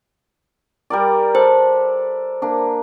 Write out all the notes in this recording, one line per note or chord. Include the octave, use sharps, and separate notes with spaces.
G3 A#4 D5
A4 C5 B5
A#3 D4